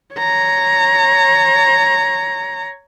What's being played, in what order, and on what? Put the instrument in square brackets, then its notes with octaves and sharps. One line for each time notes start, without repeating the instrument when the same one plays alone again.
[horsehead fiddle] C#5 A#5